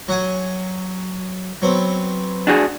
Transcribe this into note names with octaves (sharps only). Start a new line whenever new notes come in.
F#3 F#5 G#5
F#3 B3 C4
D4 F#4 G#4